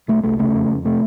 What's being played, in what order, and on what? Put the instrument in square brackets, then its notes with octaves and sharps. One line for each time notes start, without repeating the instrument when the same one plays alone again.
[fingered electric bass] C2 A3
C2 A3
C#3 A3
F2
F2
C3 A3